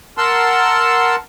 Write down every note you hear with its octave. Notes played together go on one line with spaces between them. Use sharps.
A#4 F#5 A5 C6 E6